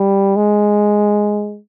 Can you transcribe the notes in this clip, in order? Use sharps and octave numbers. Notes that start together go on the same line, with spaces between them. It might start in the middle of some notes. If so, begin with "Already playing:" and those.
Already playing: G3
G#3